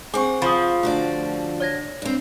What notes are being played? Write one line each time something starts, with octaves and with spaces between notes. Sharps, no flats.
C4 G#4 C5 F#5 G#5 C#6 D6
F3 B5 D#6
D3 A3 F#4 D5
C#5 G#6 A#6
G2 C4